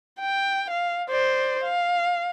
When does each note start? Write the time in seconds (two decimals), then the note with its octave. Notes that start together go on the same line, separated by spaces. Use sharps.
0.20 G5
0.70 F5
1.09 C5 D5
1.64 F5